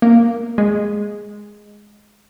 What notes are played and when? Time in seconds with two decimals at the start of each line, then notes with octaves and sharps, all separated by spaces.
0.02 A#3
0.58 G#3